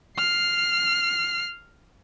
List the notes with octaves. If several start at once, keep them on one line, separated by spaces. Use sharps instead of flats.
F6 C7